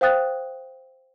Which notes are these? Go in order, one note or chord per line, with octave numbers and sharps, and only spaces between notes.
C5 F5 G5 D#6 F#6 A6